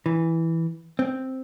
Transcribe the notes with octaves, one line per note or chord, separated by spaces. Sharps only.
E3
C4